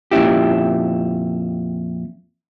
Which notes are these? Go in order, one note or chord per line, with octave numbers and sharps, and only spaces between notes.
F2 A#2 C#4 E4 G4